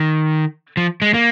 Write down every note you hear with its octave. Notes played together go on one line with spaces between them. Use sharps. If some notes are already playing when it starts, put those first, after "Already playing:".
Already playing: D#3
F3
G#3
A#3